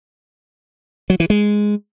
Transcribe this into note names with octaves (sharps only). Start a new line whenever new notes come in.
F#3
E3
G#3